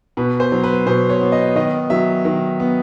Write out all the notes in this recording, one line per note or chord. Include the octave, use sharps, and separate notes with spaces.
B2 B4
C5
F#3
B4
B2 C5
C#5
B3
D#5
D#3 D#5
F#3 E5
D#3
B3